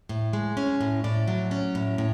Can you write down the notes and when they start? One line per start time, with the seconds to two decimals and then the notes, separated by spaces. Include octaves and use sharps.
0.09 A2
0.33 G#3
0.57 C#4
0.81 A2
1.04 A2 D5
1.28 F#3
1.51 C#4
1.75 A2
1.98 A2